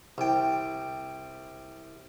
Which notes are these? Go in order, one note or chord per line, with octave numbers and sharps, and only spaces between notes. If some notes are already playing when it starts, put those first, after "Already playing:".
C2 G5